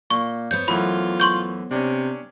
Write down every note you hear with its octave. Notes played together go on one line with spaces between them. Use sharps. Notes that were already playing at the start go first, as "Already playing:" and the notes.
A#2 C#6
B3 C5 C#5 G6
F#2 E3 A3 F4 B5
C6 C#6 G6
C3 C#4 D4